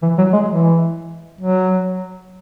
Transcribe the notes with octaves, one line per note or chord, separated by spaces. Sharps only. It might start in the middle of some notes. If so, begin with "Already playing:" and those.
E3
F#3
G#3
E3
F#3